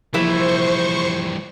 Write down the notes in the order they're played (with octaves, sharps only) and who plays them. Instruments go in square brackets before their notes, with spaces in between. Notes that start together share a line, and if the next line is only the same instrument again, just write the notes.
[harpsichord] A#1 [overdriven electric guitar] E3 G3 [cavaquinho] E4 B4 E5 [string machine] C5 C#6